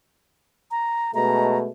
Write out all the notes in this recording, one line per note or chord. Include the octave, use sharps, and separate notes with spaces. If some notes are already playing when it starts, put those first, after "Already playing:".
A#5
B2 G#3 A3 A#5